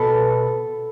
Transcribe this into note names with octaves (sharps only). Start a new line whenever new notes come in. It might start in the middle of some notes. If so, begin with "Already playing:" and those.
Already playing: B2 B3 A4